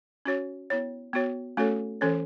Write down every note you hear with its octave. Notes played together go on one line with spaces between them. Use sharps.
C#4 F#4 C#5
B3 E4 C#5
B3 F#4 C#5
A3 C#4 F#4 A4 C#5
E3 C#4 A4 C#5